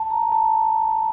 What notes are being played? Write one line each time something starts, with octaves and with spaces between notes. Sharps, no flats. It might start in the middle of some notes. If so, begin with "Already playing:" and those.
Already playing: A5
A#5
A5